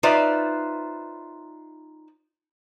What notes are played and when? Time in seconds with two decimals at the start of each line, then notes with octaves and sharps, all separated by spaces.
0.03 D#4 F4 B4 C5 D5 E5